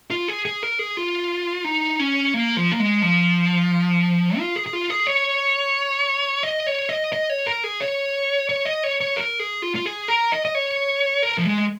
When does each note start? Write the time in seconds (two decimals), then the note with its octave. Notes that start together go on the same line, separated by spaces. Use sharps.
0.10 F4
0.28 G#4
0.45 G#4
0.63 A#4
0.79 G#4
0.97 F4
1.64 D#4
1.99 C#4
2.34 A#3
2.57 F3
2.72 A#3
2.79 G#3
3.02 F3
4.38 F4
4.56 G#4
4.66 G#4
4.73 F4
4.90 G#4
5.07 C#5
6.43 D#5
6.67 C#5
6.89 D#5
7.13 D#5
7.30 C#5
7.46 A#4
7.64 G#4
7.80 C#5
8.49 C#5
8.65 D#5
8.84 C#5
9.01 C#5
9.17 A#4
9.39 G#4
9.62 F4
9.75 F4
9.86 G#4
10.08 A#4
10.32 D#5
10.45 D#5
10.55 C#5
11.23 A#4
11.38 F3
11.46 G#3